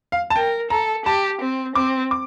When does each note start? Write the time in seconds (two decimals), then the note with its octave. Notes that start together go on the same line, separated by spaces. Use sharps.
0.12 F5
0.30 A5
0.36 A#4 G5
0.70 A4 A#5
1.05 G4 A5
1.41 C4
1.75 C4 D6
2.11 D6